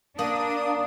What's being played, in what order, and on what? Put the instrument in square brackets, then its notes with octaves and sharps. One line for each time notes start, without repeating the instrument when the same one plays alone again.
[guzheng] A#3 [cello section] D4 [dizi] D#6